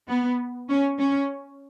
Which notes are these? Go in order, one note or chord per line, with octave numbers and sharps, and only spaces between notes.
B3
C#4
C#4